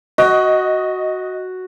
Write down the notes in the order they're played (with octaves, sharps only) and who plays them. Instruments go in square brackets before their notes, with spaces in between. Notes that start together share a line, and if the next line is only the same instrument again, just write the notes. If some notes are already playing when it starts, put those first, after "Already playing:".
[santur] F#4 [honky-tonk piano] D#5